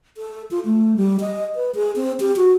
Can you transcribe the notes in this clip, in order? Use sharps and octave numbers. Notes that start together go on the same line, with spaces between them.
A4
F4
A3
G3
D#5
B4
G#4
C4
G4
F#4